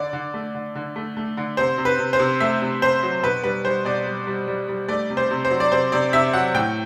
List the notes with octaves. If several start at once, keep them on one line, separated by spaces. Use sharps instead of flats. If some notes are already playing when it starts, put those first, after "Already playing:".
Already playing: D3 D5
D3
A3
D3
D3
A3
A3
D3
C3 C5
C3
B4
C3
C5
C3
A3 E5
C3
C3 C5
F#3
B2 B4
G3 B4
G3 C5
B2 D5
G3
G3
G3
G3
A3 D5
C3
C5
C3
C5
F#3
D5
C3 C5
C3 D5
C3 E5
F#3 F#5
A2 G5